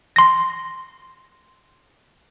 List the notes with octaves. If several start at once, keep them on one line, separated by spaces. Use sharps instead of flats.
C6 A#6